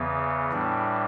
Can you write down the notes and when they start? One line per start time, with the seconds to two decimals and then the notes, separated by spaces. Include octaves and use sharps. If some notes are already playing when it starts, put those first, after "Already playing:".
Already playing: E2 C#3 E3 B3
0.52 A2 E3 G3 D4